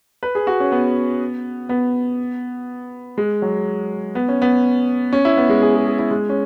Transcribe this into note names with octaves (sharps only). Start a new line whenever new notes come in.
B4
G#4
F#4
C#4
B3
B3
G#3
F#3
B3
C#4
B3
C#4
E4
B3
G#3
G#4
G#4
G#4
E4
G#3
C#4